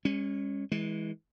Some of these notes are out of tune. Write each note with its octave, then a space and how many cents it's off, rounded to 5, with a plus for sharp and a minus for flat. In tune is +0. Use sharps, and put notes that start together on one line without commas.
G#3 -45 C#4 -10
E3 -25 G#3 +0